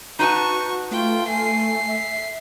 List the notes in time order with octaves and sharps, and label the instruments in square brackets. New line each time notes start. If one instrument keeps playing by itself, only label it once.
[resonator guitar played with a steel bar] D#4 B4 A5 [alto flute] F#4 [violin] C#6
[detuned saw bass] A3 [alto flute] F4 [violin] G5
[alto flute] G#5 [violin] C7
[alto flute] E5